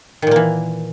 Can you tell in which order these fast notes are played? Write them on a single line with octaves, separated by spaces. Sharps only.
D#3 A#2 A#3 E3